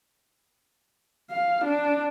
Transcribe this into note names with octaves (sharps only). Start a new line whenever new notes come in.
F5
D4